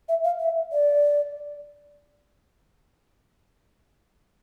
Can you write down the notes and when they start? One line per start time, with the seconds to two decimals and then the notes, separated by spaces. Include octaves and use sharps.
0.09 E5
0.24 F5
0.40 E5
0.72 D5